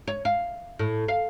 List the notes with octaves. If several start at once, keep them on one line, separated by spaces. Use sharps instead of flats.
C#5
F5
A2
F5